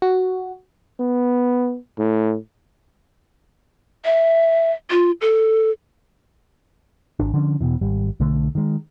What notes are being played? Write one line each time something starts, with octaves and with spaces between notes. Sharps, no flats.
F#4
B3
A2
E5
F4
A4
G#1 D4
D3 F3 C#4 D4
E1 A#1 B2 E3
G#1 G3
B1 D3 A3
D#3 G#3